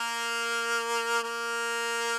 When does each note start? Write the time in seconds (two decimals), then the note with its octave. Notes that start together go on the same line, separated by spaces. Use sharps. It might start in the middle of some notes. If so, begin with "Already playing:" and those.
Already playing: A#3 A#4
1.23 A#3 A#4